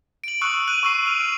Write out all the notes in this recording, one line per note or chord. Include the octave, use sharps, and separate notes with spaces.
D7 F#7
C#6 D#6 E6 F#6 C#7 F#7
F#6 D#7 F#7
C#6 E6 C7
E6 F6 D#7 F7
D7